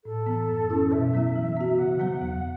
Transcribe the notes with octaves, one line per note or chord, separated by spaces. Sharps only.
A2 A4
E3 B3
F#2
E3 C#4 E4
B2 E5
F#3 B3 E4
E3
B3 F#4
C#3 F#5
F#3 B3
E2